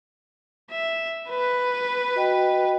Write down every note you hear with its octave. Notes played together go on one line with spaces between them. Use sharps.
E5
B4
F#4 D#5 G5